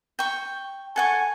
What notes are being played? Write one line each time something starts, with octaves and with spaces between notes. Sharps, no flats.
G5 C#6
A4 F#5 G#5 C#6